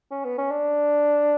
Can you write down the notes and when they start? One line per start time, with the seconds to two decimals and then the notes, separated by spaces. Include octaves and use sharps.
0.11 C#4
0.25 B3
0.38 C#4
0.51 D4